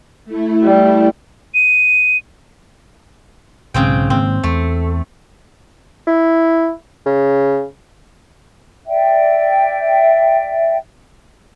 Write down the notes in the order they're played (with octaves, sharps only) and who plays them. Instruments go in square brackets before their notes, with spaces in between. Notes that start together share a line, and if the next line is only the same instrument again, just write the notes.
[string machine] A3 E4
[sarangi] G3
[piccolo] D#7
[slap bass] B1 G#2 [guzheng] C#3 C4 G5
[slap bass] G#2 D#3 A#3 [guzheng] C4
[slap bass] E2 [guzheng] A3
[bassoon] E4
C#3
[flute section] D5 E5 G5